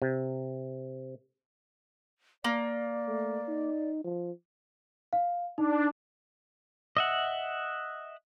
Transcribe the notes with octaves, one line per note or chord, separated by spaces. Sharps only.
C3
A#3 D5
A3
D#4
F3
F5
D4 D#4
D#5 E5 F#5